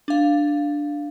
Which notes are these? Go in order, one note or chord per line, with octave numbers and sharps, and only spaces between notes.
D4 F5